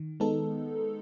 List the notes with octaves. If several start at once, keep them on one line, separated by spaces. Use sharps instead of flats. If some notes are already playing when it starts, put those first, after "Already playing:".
Already playing: D#3
G#3 B3 D#4 A4